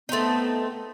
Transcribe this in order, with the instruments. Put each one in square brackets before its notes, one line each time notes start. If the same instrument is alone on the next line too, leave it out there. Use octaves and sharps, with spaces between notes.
[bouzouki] A3 C4 D#4 [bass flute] B3